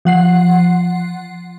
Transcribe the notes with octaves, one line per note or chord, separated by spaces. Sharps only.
F3 F#5 C7